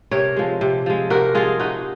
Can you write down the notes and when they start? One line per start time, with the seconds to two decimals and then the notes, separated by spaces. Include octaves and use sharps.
0.11 C3 A#4 C#5
0.37 F3 G#3
0.61 C3
0.86 F3 G#3
1.10 C3 F#4 A#4
1.35 F3 G#3 F4 G#4
1.60 C3 D#4 F#4